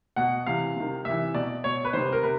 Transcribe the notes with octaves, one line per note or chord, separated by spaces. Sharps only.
B2 F#5
C3 E3 F5
C3 D#3
C3 E3 E5
B2 D5
B2 C#5
B4
C3 D#3 C5
A#4
C3 B4